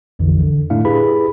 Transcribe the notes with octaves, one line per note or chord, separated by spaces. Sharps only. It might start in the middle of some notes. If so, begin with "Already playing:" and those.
A#1 F2 D3 E3
D3
A2 A3 D4 E4 F5
E4 G4 G#4 B4 B5